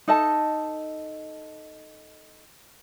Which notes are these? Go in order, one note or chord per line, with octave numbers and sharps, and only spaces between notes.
D#4 A4 D#5 A5